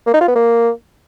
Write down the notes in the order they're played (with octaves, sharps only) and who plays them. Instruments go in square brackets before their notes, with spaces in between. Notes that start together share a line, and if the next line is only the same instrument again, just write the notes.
[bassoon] A#3
D#4
F4
B3
A#3